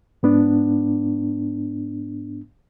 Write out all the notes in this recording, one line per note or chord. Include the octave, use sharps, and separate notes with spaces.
G#2 B3 D4